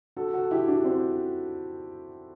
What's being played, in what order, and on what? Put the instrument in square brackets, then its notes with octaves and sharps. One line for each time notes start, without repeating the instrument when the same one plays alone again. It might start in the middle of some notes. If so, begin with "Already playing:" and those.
[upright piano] F#4 A4
F#4 A4
E4 G4
D4 F#4
C4 E4